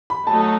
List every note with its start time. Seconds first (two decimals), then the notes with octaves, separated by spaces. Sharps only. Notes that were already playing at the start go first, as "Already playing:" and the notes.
0.10 B5
0.27 F#3 A3 D#4 A5
0.39 A5